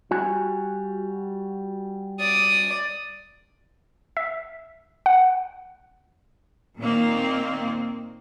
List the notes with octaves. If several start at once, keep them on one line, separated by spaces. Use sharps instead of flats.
G3 F#4 G#5
D5 D#6
E5
F#5
A#2 D#3 A#3 C4